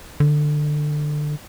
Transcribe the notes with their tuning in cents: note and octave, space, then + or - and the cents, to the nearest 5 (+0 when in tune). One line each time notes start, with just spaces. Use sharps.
D3 +20